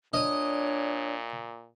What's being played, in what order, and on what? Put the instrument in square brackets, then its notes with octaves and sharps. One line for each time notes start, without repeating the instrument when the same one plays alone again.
[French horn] A#2 [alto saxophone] D4 [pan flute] C#5 [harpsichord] D#5 D#6